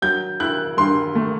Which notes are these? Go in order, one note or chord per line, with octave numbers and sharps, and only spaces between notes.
F#3 G6
E4 F#6
G2 C6
A3